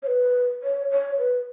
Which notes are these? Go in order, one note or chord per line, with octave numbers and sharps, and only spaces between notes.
C#5
B4
C#5
C#5
B4